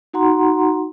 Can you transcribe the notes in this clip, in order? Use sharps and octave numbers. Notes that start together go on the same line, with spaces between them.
D#4 F#4 F#5 A#5 C6